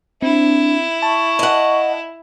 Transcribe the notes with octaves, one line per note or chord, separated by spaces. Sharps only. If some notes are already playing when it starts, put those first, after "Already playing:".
C4 D4 E4
A5 C#6
D#5 F#5